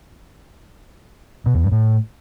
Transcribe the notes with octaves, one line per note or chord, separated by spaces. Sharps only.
B2
E2
G2
A2